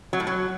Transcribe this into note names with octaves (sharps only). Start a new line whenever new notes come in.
F#3
A2
F#3